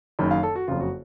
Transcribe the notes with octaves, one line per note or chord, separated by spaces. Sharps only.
F#1 F#2 D#3
F5
A4
F#4
F#1 F2 C#3 F4
F#4